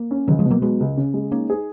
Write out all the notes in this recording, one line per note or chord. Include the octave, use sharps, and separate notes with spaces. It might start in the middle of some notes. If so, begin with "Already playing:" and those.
Already playing: A#3
C#4
C#2 D#3 F#3
F3 G#3
B2
F#3 A#3
F#3 G#3 B3
C#2
C#3
G#3
A#3 C#4 D#4
G#4